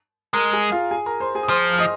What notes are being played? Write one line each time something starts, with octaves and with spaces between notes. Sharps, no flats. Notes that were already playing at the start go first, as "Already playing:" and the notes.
G#3 A#4 A#5
G#4 G#5
F4 F5
G#4 G#5
A#4 A#5
C5 C6
G#4 G#5
D#6
F3 C5 C6
F6
D#5 D#6